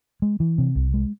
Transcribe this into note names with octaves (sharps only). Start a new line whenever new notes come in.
G#3
E3
C3
C2
G#3